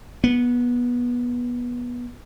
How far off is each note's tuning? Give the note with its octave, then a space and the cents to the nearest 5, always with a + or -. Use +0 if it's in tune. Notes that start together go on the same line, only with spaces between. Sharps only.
B3 -20